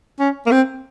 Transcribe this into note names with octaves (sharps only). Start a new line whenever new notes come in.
C#4
A#3
C4